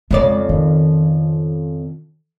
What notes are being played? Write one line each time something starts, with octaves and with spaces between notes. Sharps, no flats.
F2 C#3 G#3 D5
D#3